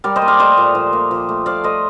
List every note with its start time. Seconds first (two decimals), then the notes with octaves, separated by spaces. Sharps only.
0.04 G3 A#4 D5
0.16 C5 D#5
0.22 A#3
0.28 D5 F5
0.40 A3 C5 D#5
0.57 A#2
0.75 F3
0.93 A#3
1.11 F3
1.29 A3
1.46 F3 D5 F5
1.64 A3 C5 D#5